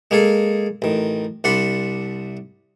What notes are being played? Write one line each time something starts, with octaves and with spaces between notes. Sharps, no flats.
G#3 A#3 G#4 A4
A1 D#3
C2 D4 F#5 B5 C6